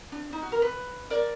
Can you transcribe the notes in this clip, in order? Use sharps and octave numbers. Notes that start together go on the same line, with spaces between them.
D4
D#4
F#4
A#4
B4
A#4 D5